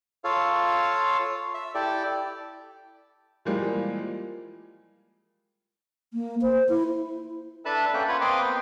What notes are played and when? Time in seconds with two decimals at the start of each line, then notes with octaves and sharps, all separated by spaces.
0.24 F4 A4 C#5 F5
1.54 E5
1.74 E4 G4 A4 D5
3.45 A#2 E3 F3 G3 G#3 A#3
6.14 A#3
6.42 C5
6.69 E4
7.65 D4 A4 B4 E5 A5 B5
7.94 A#3 C#4 A4 E5 G5 F#6
8.09 F4 B4 C#5 F#5 B5
8.21 A#3 C4 B4 D#5 C6 D6
8.42 B3 C4 G5